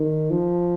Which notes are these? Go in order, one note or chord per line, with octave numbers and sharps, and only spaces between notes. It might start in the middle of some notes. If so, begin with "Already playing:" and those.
Already playing: D#3
F3